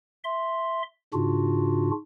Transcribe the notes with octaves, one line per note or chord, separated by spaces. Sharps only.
E5 C6
G#2 C#3 D4 F4 F#4